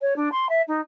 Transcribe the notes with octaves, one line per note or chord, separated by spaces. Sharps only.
C#5
D4
C6
E5
D#4